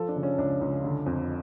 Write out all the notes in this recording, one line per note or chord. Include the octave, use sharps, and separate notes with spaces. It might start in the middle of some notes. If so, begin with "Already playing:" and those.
Already playing: F3 A4
D4
C#3
C#4
C#2 D4
C#2
D3
F2